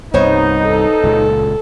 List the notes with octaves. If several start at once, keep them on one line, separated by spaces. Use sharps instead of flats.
C2 G2 B3 D#4 C5 C#5
A4
C#2 A#2 C#3